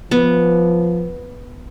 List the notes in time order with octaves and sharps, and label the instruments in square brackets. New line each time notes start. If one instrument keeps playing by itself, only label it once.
[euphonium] F3 [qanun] B3